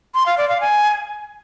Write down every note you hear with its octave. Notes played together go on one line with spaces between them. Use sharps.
C6
F5
D5
F5
G#5